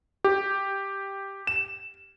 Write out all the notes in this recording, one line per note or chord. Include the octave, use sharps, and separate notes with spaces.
G4
E7